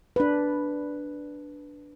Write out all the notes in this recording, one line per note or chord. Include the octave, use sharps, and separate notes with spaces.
D4 B4